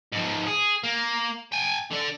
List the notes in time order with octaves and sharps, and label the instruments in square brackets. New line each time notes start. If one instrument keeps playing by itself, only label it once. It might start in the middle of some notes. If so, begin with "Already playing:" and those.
[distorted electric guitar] G#2 F3
G#4
A#3
G5 G#5
D3 D5